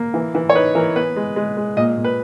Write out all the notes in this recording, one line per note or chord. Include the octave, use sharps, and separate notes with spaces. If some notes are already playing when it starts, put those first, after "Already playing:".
Already playing: A#3
E3
E3
C#5
D#4 B4
E3 A#4
B3 B4
G#3
G#3
G#3
A#2 D#5
A#2
B4